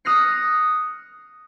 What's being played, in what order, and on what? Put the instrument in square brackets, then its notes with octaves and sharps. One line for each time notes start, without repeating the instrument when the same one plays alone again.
[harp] D#6 F6 F#6 A#6 C7 C#7